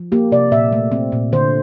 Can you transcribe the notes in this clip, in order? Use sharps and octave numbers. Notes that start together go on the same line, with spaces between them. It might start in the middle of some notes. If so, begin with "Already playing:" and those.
Already playing: F3
A#3 G4
C3 D5
A#2 E5
A3
C4
A#2
D3 C5